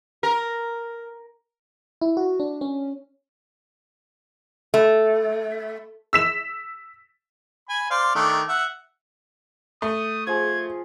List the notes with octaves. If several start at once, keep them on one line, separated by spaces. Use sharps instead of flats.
A#4
E4
F#4
D4
C#4
A3
E6 B6 E7
G#5 B5
C5 D5 F5
D#3 A3 D4
E5 F#5
A3 D#6
F3 G#4 G#6